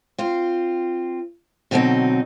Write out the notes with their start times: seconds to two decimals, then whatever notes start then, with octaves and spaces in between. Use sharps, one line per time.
0.18 C4 F4
1.71 B2 D3 F#3 A#3 C4 D#4